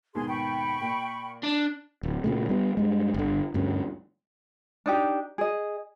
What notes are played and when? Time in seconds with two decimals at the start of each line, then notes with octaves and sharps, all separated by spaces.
0.15 D#2 G#2 B2 G#4 C6
0.28 G5 B5 C#6
0.81 A#2
1.43 D4
2.03 D1
2.24 A#2 C#3 A3
2.49 G3 B3
2.77 G2 G#3
3.14 G1 D3
3.54 D2 G2 C#4
4.86 D4 D#4 G4
5.38 G#4 D#5